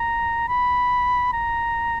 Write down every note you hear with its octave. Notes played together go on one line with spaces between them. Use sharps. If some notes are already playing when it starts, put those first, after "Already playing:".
Already playing: A#5
B5
A#5